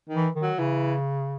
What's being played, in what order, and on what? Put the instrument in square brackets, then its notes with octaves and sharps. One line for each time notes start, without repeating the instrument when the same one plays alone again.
[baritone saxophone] D#3
[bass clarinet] E3
D#3
[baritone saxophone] F#3
[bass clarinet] C#3 [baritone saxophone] E3